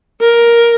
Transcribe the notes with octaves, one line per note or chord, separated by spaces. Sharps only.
A#4